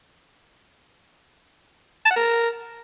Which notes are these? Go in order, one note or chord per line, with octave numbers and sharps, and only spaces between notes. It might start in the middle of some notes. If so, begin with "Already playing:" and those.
A5
F#5
A#4